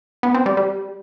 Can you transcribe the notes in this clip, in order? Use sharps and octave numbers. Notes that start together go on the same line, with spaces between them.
B3
C4
G3
G3